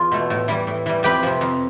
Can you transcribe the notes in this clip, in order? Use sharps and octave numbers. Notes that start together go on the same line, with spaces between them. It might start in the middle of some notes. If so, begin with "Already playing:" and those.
Already playing: E2 F4
B2 A3
A2
E3 G3
A2
E3 G3
F2 G4 B4
C3 F3
F2